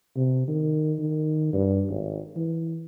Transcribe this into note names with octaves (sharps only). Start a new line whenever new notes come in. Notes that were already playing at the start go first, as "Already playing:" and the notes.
C3
D#3
D#3
G2
G#1
E3